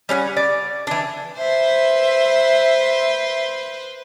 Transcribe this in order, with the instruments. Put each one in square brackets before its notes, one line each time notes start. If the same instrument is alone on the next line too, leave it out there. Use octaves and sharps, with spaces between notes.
[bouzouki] G3 C#4 F5 F#5
D5
E3 D4
[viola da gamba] B4 C5 [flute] E5